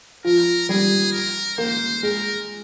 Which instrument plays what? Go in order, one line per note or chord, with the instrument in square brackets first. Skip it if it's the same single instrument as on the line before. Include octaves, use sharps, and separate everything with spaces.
[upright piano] F3 [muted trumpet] A#4
[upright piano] G3 [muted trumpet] G#4
[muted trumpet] A#4
[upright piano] A#3 [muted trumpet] C5
[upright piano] G#3 [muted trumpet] A#4